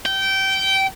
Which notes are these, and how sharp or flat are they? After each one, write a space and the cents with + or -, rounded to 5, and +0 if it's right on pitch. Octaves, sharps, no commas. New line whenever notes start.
G5 -20